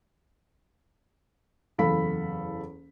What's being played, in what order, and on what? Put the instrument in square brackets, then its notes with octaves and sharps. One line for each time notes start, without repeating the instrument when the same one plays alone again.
[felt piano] F#1 E2 A4 F5 B5 B6